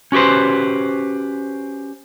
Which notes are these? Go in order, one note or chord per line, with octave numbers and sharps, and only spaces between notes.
C#4 F#4 G4 B4 C5